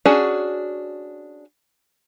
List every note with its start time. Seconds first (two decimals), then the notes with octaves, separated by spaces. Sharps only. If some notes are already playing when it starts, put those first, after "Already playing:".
0.06 C#4 D4 F#4 G#4